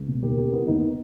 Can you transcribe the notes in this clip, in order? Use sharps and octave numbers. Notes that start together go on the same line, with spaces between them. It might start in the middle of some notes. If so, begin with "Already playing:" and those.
Already playing: C#2
B2
D#2 G4 A#4
C#3 G4 A#4
E3 B3
D#2 B3 D#4